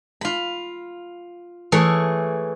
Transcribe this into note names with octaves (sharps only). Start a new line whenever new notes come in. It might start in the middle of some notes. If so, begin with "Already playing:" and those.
F4 B5
E3 A3 G#4 C#5